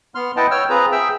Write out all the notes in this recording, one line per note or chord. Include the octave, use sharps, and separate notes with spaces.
B3 C6 F6
E4 B4 D#5 F#5 G5 A5
C#5 G5 E6 F6
C4 F4 G#4 B4 A#5
G#4 E5 G5 E6